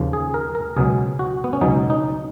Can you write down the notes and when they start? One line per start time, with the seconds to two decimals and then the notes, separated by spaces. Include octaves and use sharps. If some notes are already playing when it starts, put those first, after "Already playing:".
Already playing: D#2 C#3 F3
0.13 G#4
0.34 A#4
0.55 A#4
0.76 C#2 B2 F#3 G#4
1.19 F#4
1.44 B3
1.53 C#4
1.61 C#2 B2 F#3 D#4
1.90 D#4